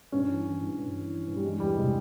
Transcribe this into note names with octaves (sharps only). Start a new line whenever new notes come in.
G2 C#4
E3
E3
G2
G2
E3
E3
G2
G3
E3 G#3
E2 G3
C3 G#3